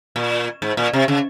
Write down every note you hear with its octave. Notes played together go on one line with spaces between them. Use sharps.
A#2
G#2
A#2
C3
C#3